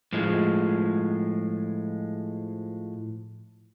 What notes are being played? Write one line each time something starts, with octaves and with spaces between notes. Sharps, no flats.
A2 F3 G#3